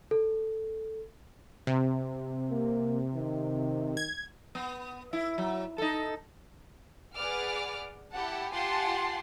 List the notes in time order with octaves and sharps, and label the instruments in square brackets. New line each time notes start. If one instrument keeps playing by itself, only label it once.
[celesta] A4
[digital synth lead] C3
[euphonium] A#3
D#3
[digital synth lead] G#6
[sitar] B3
E4
F#3
D#4 A4
[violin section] G#4 B4 D5 F#5 D6 F6
E4 G4 F#5 A5
F4 G4 F#5 G#5 A5 C6